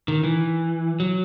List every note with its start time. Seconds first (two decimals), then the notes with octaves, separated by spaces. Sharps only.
0.08 D#3
0.24 E3
1.00 F#3